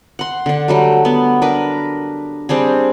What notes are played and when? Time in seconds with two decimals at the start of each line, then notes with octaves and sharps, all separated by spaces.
0.19 F#5 C6
0.46 D3 D4
0.68 F#3 G3 A3
1.05 B3
1.42 D4 A#4 B4
2.49 G3 C4 D4 G#4